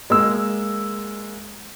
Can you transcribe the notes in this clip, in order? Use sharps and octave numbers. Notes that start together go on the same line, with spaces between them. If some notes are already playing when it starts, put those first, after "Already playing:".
G#3 A#3 E6